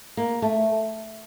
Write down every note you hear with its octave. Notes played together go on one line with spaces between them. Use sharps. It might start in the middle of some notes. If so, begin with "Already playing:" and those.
A#3
A3